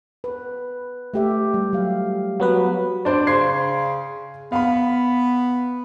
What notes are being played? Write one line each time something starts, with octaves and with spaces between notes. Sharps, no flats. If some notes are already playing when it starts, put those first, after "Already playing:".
B4
A3 G4 E5
G3
F#3 G4 F5
F#3 B3 B4
D4 C5 D5
C#3 C6 G#6 C7
B3 F5 B5